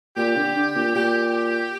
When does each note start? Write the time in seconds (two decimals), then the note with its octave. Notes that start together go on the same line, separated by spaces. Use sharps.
0.17 A#2 G4
0.36 D3
0.56 D3
0.75 A#2
0.95 A#2 G4